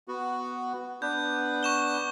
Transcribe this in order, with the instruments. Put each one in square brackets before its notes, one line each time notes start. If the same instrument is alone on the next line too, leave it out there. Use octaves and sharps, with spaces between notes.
[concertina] B3 F#4
[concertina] B3 D4 B4 [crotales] G6
[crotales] C#6 E7 G7